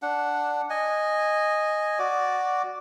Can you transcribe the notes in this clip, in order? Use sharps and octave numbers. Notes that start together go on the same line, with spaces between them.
D4 F#5
D#5 G#5
F#4 D5